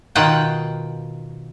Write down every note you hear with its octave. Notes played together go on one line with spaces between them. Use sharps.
B2 D#3 F4 F#5 G5